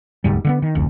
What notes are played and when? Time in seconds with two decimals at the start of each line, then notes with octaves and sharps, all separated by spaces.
0.24 E1 D2 G#2 G3
0.45 D3 A3 B3
0.62 D#3
0.75 F1 D2